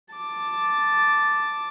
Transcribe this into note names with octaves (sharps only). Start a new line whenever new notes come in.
A5 D6